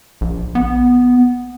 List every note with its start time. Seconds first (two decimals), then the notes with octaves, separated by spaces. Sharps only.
0.21 A#1
0.55 B3